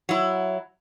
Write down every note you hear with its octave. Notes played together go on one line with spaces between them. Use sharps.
F#3 E4